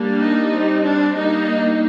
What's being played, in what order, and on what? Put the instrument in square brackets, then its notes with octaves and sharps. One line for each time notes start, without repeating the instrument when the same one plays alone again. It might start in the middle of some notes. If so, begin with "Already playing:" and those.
Already playing: [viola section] G3 A#3 D4
D#4
G3 C4
D4
G3 A#3 D4 D#4